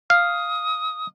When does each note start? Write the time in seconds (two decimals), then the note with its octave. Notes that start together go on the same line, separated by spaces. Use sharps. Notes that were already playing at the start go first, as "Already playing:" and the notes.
0.10 F5 D#6